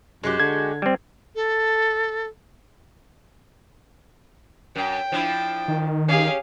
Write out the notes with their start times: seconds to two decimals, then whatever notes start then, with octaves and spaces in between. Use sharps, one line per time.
0.24 F#2 G#3 F#4 G4
0.40 D3 G#6
0.82 G3 C4
1.35 A4
4.76 F#2 G5
5.12 F3 D4 E4
5.68 D#3
6.08 C#4 G4 G#4 F5